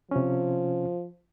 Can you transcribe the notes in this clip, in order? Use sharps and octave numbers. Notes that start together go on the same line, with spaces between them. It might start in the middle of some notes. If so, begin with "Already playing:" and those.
C3 F3 C#4